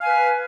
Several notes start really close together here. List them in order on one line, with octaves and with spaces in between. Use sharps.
F5 G#5 B4